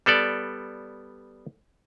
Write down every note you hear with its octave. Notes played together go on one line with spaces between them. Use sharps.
G3 B3 A4 D5